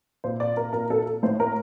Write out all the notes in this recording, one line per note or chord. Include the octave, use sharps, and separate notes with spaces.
A#2 C5
D5
A#4
A#2 A#4
A4
A2 C5
A#4